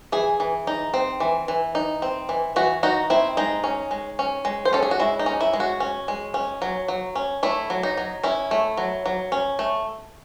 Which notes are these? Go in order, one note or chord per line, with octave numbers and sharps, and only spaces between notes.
E3 G#4
E3
D#4
C4
E3
E3
D#4
C4
E3
E3 F#4
D#4 F#4
C4 E4
G#3 D#4
C#4
G#3
C#4
G#3
C5
C#4 A4
G#4
F#4
G#3 E4
D#4
C#4
E4
G#3
F#4
C#4
G#3
C#4
F#3
F#3
C#4
A3 E4
F#3
D#4
F#3
C#4 E4
A3
F#3
F#3
C#4
A3